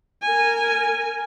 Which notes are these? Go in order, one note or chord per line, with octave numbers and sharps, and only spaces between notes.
A#4 G#5